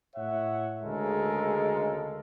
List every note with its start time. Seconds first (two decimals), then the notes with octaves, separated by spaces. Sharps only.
0.16 A2 C#5 E5 F#5
0.82 D2 C#3 G#3 A4 A#4